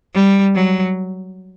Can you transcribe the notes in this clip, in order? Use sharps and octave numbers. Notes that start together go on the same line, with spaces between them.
G3
F#3